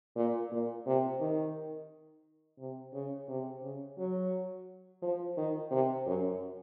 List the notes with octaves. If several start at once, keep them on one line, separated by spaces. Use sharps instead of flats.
A#2
A#2
C3
D#3
C3
C#3
C3
C#3
F#3
F3
D#3
C3
F#2